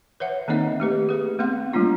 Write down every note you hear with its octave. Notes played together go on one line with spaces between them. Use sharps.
B4 C#5 E5 F#5
D#3 A#3 C4 D#4 D#5 E5
A3 G4 B4
G#4 B4
A3 B3 C4 F5 C6
G3 A3 A#3 D4 F4